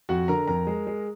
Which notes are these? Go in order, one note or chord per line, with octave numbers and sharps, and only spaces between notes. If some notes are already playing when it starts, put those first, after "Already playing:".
F2 F#4 F#5
D3 A#4 A#5
F2 A#4 A#5
G#3
G#3